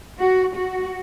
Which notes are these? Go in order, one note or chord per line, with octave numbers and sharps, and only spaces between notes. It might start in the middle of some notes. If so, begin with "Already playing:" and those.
F#4
F#4